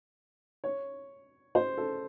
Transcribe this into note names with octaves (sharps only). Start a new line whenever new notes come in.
C#5
C5
A4